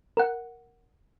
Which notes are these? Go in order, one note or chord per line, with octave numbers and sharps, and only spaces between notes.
A#4 F#5